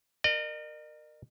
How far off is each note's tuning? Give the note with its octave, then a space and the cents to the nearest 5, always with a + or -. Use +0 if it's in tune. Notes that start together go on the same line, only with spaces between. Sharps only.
A#4 +0 D#5 -45